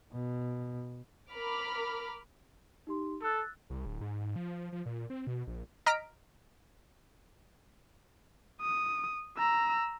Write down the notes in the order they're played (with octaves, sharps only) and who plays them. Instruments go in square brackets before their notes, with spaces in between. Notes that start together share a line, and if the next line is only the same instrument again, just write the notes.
[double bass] B2
[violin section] A#4 B5 D6 F6
[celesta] D#4 G4 C6
[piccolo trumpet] A4 [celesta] E6 F#6 A6
[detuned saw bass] C2
D1
G#2
F3
F3
A#2
C4
B2
A#1
[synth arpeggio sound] D#5 A#5 F6 A#6 B6 D7
[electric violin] D#6
A#5 E6